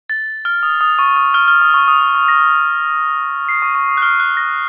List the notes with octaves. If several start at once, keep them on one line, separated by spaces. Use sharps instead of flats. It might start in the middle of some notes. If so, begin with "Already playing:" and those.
A6
F6
D#6
D#6
C#6
D#6
F6
F6
D#6
C#6
D#6
C#6
C#6
A#6
C7
C#6
C#6
D#6
F#6
F6
F#6
A#6